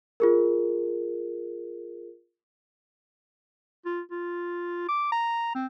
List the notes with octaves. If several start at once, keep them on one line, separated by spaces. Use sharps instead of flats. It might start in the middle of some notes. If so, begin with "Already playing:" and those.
F4 G#4 A#4
F4
F4
D6
A#5
C4